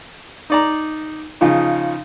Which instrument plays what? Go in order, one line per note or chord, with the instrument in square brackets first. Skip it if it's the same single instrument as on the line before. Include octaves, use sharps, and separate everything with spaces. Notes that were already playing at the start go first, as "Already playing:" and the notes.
[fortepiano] D#4 D5 A#5
C#3 F3 D#4 F4